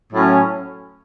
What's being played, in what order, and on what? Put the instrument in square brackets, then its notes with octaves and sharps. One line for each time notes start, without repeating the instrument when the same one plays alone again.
[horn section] A2 F#3 A3 C#4